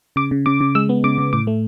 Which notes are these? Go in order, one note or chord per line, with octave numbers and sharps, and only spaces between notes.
C#3 D6
C#3
C#3 D6
C#3
G#3 E6
B3
C#3 D6
C#3
A2 D6
A3